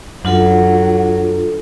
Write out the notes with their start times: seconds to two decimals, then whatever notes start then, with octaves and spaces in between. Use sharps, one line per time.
0.25 F#2 F#3 D4 F4 A4 F#5